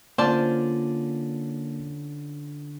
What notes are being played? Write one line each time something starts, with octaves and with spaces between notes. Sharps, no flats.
D3 A#3 C#4 F4 C5 D5 A5